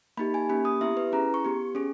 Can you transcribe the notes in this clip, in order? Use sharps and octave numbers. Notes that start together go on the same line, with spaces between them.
A#3 D#4 G4 B5
G#5
A#3 C#4 G4 B5
D#6
B3 E4 G4 E5
B4
C#4 E4 G#4 A#5
C#6
B3 G4
C#4 G#4